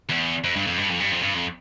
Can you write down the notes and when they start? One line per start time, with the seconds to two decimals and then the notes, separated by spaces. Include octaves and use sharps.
0.10 E2
0.44 F2
0.56 G2
0.67 F2
0.78 G2
0.90 F2
1.00 G2
1.11 F2
1.23 G2
1.34 F2